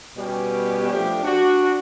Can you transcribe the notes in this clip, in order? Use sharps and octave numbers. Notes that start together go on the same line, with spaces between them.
B2 G3 B3 C#4 G4
F3 A3 D4 G4
D4 F#4